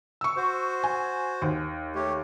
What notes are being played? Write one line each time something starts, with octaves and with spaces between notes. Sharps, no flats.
C#6 E6
F#4 C5
G#5
D#2
A3 G4 C#5